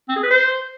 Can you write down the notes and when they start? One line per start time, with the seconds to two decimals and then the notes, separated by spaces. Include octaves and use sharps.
0.09 C4
0.16 G#4
0.23 B4
0.30 C5